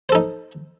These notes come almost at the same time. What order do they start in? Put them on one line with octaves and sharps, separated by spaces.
C5 A4 D#4